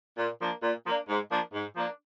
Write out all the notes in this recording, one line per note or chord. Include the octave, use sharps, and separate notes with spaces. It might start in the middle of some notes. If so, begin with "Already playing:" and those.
A#2
F3 A#3 D4
A#2
F3 A#3 D4
G#2
F3 A#3 D4
G#2
F3 A#3 D4